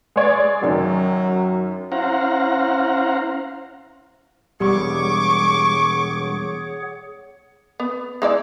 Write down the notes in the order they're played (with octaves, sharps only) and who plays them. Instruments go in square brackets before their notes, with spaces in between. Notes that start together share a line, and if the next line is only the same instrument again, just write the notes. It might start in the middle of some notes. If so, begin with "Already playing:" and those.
[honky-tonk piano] G#3 C#5 D5
[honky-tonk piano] F#2 D#3 [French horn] F#3
[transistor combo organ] C#4 E4 C5 F5 F#5 A#5
[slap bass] E1 [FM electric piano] G3 [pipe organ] G#4 C#5 F#5 [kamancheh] C#6 D6
[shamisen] B3
G#3 E4 D5